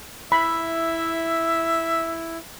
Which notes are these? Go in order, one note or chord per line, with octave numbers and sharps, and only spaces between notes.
E4 E5 B5